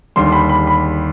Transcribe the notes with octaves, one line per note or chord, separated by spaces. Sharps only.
D#2 D3 G3 C6
B5
B5
B5